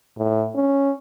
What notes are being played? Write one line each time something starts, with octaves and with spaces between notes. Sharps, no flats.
A2
C#4